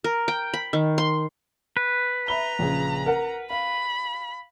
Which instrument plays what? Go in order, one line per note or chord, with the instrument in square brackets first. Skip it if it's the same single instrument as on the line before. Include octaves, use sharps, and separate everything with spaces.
[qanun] A#4
G5
B5
D#3
C6
[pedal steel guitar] B4
[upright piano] E5 B5 G7 [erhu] A#5
[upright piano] A#1 C#3
A#4 F#5
[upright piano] F5 [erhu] B5